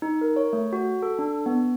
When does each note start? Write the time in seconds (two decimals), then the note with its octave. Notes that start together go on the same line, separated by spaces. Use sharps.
0.02 D#4
0.21 A#4
0.36 C#5
0.53 A3
0.73 F#4
1.03 A4
1.19 D4
1.46 B3